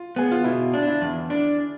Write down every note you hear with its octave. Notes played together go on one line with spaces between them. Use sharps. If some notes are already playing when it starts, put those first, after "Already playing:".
Already playing: F4
B3 G#4
F4
B2 E4
D4
E4
E2
D4